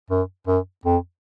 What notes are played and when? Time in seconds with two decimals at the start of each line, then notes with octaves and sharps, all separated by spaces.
0.10 F#2
0.47 F#2
0.85 F2